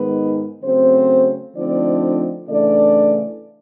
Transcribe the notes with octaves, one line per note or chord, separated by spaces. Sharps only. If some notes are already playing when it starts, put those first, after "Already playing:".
Already playing: G#2 D#3 G#3 B3 D#4 B4
C#3 F#3 A3 C4 C5
D3 F3 A3 C4 D4 D#4 D5
C#3 E3 A3 D4 D5